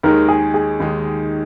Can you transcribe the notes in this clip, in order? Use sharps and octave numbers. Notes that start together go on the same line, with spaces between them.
D#2 D#3 G#3 A#4
G#4
G#4
D#2 D#3 G#3